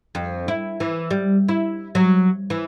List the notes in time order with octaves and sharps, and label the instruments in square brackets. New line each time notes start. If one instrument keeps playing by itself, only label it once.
[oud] F2
E4
E3
G3
E4
F#3
E3